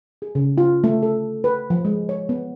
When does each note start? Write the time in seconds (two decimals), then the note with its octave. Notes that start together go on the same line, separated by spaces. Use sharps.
0.22 G#4
0.35 C#3
0.58 F4
0.84 A3
1.03 A4
1.44 B4
1.70 F3
1.85 G#3
2.09 C#5
2.29 B3